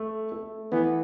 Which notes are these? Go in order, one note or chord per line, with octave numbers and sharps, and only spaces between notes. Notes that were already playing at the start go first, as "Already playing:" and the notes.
Already playing: A3
A3
E3 B3